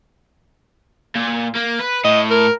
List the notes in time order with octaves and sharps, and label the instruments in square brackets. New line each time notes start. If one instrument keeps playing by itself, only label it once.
[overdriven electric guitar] A#2
A#3
B4
[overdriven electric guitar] A2 [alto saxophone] D#5
[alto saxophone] A#4